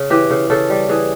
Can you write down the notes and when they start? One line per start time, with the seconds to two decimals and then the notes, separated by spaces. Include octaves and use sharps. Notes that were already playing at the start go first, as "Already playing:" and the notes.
Already playing: C#3
0.10 E3 G4
0.30 C#3
0.50 C#3 A4
0.70 G3
0.89 E3 G#4